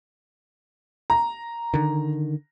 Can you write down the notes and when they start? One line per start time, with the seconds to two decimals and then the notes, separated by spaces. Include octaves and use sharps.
1.10 A#5
1.74 D3 D#3